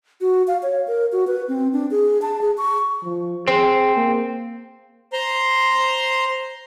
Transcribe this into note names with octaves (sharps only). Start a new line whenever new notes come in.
F#4
F5
C#5
A#4
F#4
B4
C4
D4
G#4
A5
G#4
C#6
F3
C4 G#4 C5
A#3
C5 A#5 C6